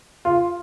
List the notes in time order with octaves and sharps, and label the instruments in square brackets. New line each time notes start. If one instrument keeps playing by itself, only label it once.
[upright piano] F4